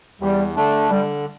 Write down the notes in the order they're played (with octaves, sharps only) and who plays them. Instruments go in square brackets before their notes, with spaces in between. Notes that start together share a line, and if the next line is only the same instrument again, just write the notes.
[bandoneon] E2 [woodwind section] G3
[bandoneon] D3 A3 D4
[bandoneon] D3 [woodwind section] G3